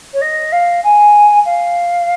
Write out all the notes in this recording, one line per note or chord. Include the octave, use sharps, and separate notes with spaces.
C#5
D#5
F5
G#5
F5